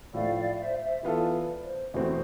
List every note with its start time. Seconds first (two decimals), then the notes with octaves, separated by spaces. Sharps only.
0.13 A2 F3 A3 D5 F5
0.35 D5 F5
0.58 C5 E5
0.81 C5 E5
1.03 E3 B3 F4 A4 B4 D5
1.33 B4 D5
1.63 C5
1.94 E2 B2 A3 C4 B4